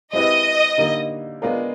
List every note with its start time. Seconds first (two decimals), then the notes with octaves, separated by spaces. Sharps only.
0.13 G#3 C4 E4 G4 B4 D#5
0.78 D3 G3 A#3 D#4
1.42 G#3 B3 D4 F4 A#4